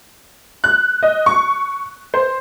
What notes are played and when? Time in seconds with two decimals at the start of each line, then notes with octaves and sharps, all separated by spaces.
0.64 F#6
1.03 D#5
1.26 C#6
2.14 C5